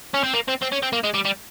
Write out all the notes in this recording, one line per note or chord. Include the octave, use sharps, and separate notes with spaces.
C#4
C4
A#3
C4
C4
C#4
C4
A#3
G#3
G3
G3